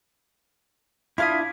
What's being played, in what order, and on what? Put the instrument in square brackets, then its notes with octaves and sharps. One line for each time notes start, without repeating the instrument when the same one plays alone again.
[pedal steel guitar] D4 E4 [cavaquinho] F4 F5 D#6 [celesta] E5 G#6 B6